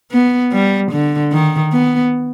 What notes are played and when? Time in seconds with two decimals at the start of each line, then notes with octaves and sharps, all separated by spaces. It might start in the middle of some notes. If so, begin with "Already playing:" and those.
0.11 B3
0.52 G3
0.92 D3
1.33 D#3
1.72 B3